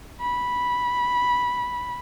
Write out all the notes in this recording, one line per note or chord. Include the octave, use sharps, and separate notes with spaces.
B5